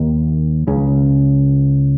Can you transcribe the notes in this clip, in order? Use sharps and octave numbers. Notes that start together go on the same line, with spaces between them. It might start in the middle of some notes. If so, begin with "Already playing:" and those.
Already playing: D#2 D#3
C#2 C#3